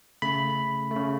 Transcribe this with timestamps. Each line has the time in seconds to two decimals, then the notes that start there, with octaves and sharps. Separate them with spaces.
0.22 C#3 A3 B5
0.91 C#3 A3